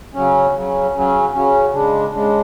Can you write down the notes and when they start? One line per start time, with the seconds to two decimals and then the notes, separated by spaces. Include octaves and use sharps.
0.15 C#3 F#3 C#4
0.55 C#3 F#3 C#4
0.94 C#3 F#3 C#4
1.34 C#3 F#3 C#4
1.73 C#3 G#3 D4
2.13 C#3 G#3 D4